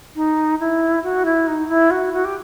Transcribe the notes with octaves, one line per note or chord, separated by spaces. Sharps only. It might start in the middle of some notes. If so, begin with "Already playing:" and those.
D#4
E4
F#4
E4
D#4
E4
F#4
F#4
G4